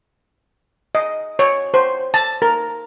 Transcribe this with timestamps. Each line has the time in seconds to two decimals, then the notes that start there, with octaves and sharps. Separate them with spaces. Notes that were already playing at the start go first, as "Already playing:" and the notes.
0.95 D#5
1.39 C#5
1.74 C5
2.14 A5
2.42 A#4